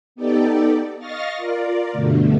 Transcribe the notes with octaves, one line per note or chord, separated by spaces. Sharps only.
B3 D#4 G4 A4 D5
D#5 F5 C#6 F6 A6 A#6
F4 A#4 D5
G2 B2 D3 A3